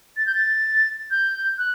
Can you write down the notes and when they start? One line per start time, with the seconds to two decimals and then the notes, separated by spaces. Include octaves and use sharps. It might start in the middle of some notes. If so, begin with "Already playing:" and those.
0.17 A6
0.27 G6
0.35 A6
1.11 G6
1.58 F#6